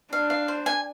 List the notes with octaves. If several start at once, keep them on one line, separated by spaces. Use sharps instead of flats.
D4 F5
F5
C5
G#5